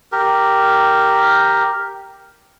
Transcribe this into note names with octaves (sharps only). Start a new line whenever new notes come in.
G4 A#4